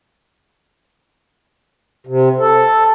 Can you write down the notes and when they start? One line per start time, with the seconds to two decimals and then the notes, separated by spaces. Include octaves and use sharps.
2.07 C3
2.39 A4